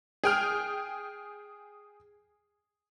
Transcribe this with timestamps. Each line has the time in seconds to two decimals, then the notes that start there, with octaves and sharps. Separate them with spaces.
0.24 G#4 G5 F6